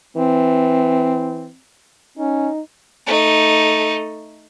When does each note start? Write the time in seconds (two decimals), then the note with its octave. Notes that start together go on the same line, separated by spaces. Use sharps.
0.17 E3 C4
2.18 C#4 D#4
3.06 A3 D#4